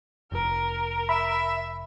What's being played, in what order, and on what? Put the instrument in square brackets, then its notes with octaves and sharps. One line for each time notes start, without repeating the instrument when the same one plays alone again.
[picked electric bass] F1 [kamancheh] A#4
[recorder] E5 [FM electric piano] B5